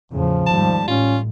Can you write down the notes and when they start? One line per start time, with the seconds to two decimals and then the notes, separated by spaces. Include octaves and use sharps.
0.12 E2 A2 C#3 F3
0.47 D#2 G#2 G3 A5
0.88 A1 C#4 F4